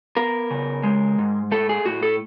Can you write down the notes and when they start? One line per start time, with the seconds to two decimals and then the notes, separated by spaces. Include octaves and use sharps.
0.17 B3 A#4
0.51 C#3
0.83 G#3
1.19 G#2
1.51 A3 A4
1.69 G#4
1.86 A2 F#4
2.03 A4